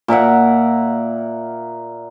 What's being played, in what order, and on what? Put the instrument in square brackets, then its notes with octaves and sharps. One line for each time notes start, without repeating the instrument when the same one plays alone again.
[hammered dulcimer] A#2 A#4 E5 F#5